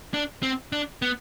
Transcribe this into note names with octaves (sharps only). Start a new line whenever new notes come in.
D4
C4
D4
B3